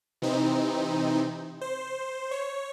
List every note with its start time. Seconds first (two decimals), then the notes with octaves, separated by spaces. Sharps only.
0.22 C3 E3 C4 D#4
1.61 C5
2.31 C#5